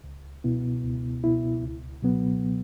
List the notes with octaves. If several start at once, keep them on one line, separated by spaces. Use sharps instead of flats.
C#2
B2 B3 E4
C#2
B2 B3 E4
C#2
B2 F#3 B3